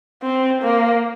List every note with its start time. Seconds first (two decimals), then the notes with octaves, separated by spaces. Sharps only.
0.23 C4
0.62 A#3